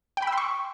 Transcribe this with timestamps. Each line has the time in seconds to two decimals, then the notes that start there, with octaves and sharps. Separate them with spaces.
0.17 G5
0.22 B5
0.27 E6
0.32 C6
0.38 C#6